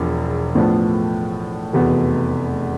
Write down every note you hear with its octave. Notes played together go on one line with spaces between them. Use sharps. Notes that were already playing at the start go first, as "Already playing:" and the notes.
Already playing: E1 E2 F3
A2 F3 B3 D4 A4
F1 E2 B2 B3